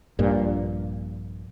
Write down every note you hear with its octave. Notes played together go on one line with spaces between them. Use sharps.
A#1 G2 A#2